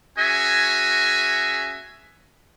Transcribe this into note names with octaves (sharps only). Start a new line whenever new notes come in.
C#4 F#4 G#4 E5 G#5